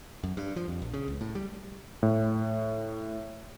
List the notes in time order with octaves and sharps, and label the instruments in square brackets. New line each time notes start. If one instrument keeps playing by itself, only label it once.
[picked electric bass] F#2
G2
F3
F2
A#1
C#3
C#2
A2
G3
[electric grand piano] A2